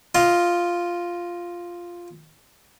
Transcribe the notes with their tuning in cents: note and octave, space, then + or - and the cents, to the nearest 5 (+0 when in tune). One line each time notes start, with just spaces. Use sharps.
F4 +0 D#5 +10